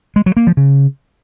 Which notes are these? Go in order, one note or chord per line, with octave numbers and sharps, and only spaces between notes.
G#3
F#3
A#3
F3
C#3